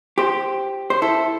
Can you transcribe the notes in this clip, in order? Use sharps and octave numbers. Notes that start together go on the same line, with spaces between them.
G4 C5
C5
E4 A4